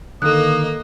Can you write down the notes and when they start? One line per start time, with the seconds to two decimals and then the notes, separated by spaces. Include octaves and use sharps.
0.22 D3 D#3 A#3 A4 D#5 D#6 F#6